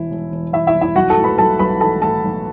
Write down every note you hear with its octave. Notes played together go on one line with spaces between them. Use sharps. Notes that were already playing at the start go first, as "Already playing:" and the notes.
Already playing: E1 E2 E4
E1
E1
E1 E4 E5
E4 E5
E2
E4 E5
B1 F#4 F#5
A4 A5
A2
B4 B5
B1 A4 A5
B1 B4 B5
E3 A4 A5
A2 A4 A5
B1